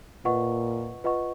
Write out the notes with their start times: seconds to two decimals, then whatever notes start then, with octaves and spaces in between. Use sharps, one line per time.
0.25 A#2 F4 B4 D#5 F#5 C#6
1.04 F4 B4 D#5 F#5 C#6